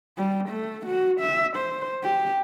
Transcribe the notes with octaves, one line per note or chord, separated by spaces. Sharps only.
G3
A3
F#4
E5
C5
G4